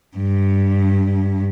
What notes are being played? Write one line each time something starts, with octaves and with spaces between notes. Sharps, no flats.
G2